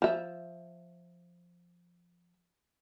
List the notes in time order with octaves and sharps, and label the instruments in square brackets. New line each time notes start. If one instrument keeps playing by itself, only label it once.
[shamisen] F3 E5